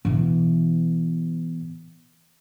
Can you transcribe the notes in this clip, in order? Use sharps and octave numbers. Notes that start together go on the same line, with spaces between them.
B2 E3